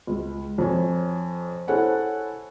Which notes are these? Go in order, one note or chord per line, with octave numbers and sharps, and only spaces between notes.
C#2
F2 C#5 G#5
E4 A4 C5 C#5 F#5 G#5